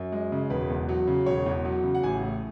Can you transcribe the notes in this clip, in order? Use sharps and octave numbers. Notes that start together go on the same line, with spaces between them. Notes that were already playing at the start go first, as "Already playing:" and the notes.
Already playing: F#2
G#3
C#3
E1 B4
E2
F#3
C#3
E1 C#5
E2
F#3
C#3
F#5
A1 G#5
A2